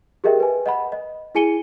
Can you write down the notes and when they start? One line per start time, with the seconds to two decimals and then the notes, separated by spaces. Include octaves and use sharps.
0.24 G4 G#4 A#4 D#5 E5 G5
0.40 B4 G#5
0.66 D#5 F#5 B5
0.92 D#5
1.35 E4 G#4 G#5 C#7 D#7 G7